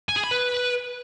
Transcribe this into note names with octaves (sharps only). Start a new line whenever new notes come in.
G#5
G#4
B5
B4